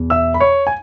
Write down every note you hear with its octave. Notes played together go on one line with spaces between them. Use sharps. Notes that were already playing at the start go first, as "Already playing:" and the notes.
Already playing: E2 B2
E5 E6
B5
C#5 C#6
G#5